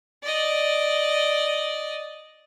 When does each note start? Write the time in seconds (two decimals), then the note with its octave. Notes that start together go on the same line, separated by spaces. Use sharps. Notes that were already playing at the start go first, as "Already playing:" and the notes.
0.23 D5 D#5